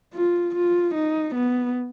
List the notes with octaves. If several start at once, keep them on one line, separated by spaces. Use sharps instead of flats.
F4
F4
D#4
B3